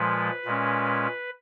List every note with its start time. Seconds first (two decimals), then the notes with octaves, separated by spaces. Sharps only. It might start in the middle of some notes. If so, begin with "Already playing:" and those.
Already playing: A#2 F3 G#3 B4
0.45 A#2 G#3 C#4